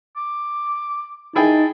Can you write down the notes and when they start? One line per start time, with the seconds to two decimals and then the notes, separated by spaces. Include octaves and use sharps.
0.16 D6
1.35 D#4 E4 G#4 G5 A5